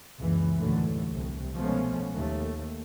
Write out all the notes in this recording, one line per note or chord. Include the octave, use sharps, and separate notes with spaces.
F#1 C#2 E3
D#2 A2 D3 E3 F#3 A3
C2
B2 F3 G#3 A3 B3 C#4
D#2 A3